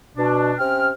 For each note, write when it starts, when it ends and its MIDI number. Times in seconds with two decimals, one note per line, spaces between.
0.17 0.53 47
0.17 0.53 62
0.58 0.89 48
0.58 0.89 61
0.58 0.89 79
0.58 0.89 89